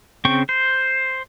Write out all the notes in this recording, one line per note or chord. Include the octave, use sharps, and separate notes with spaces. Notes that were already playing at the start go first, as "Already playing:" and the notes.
C#3 C4 G5 C#6
C5